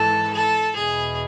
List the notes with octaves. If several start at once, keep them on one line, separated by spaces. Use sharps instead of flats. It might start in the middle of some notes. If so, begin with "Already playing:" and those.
Already playing: G#2 E3 A4
A4
E2 B2 G#4